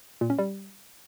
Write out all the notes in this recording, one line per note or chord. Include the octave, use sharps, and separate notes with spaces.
A#2
C#4
G3